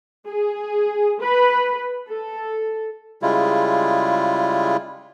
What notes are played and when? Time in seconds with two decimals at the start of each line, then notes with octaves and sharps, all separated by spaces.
0.26 G#4
1.21 B4
2.09 A4
3.22 C#3 G3 G#3 E4 F4